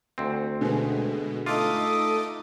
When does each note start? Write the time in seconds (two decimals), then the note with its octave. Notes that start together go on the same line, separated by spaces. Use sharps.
0.18 D2 C4
0.61 B2 D3 G#3 B3 G#4
1.46 A3 D#4 F4 A4 D#5 D6 D#6